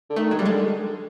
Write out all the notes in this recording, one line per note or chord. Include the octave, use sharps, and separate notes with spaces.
D3
D#3 A3
F#3
G3
C#3
D3 G#3